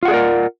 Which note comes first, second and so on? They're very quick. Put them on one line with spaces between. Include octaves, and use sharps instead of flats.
F4 F#5 G#4 D5 A#4